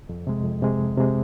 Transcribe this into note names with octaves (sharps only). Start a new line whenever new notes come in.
F2
C3 G#3
F2
C3 G#3
F2
C3 G#3